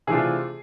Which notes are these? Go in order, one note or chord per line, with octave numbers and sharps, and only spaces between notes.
C3 E3 A3 D4 F4 G#4